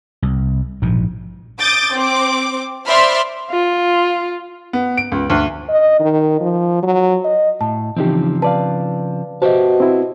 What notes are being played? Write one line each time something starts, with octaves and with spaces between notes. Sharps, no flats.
C2
A#1 G#2 B2
D6 D#6 G6 A6 D7
C4 D6
C5 D5 E5 B5 C6 F6
F4
B3
D7
C#2
D2
D#5
D#3
F3
F#3
D#5
A2 A5
C#3 E3 F3 C4 D#4 G4
B4 D5 F5 A5
B2 G4 C5 D#5 E5 A5
C4 E4